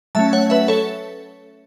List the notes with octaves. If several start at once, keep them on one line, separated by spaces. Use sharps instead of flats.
F#3 A3 C#4 E5 A5
C#5 F#5
B4 E5
A4 C#5